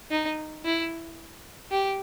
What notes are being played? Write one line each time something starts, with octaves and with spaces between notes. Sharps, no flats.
D#4
E4
G4